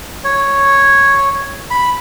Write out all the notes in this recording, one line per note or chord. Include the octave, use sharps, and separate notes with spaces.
C#5
B5